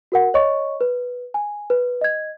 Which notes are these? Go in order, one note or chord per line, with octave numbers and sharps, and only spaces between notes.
F#4 A#4 F#5
C#5 D#5 C#6
B4
G#5
B4
D#5 G#6